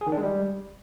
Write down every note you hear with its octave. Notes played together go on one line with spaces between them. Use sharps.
G#4
D#3
D4
G#3
G3